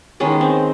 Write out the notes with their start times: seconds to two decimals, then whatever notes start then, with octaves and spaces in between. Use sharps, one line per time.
0.20 D#3 G#3 B3 C#4
0.41 C4